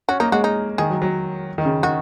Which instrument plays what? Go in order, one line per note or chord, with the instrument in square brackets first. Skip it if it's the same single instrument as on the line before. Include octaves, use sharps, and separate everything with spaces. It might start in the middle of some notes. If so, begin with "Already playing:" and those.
[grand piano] C#4 [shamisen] F#4
[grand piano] A#3 [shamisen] D#4
[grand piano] G#3 [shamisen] F#4
[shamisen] D#4
[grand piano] D#3 [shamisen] G#4
[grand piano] F#3
F#3
D#3
C#3
[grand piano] D#3 [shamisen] F#4